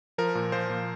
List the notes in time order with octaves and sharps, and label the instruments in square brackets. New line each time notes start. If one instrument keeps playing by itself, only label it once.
[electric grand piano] F3 A#4
A#2
F3 C5
A#2